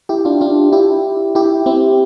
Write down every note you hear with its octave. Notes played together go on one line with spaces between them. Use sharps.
E4 G4
D4 F4
D4 F4
E4 G4
E4 G4
C4 E4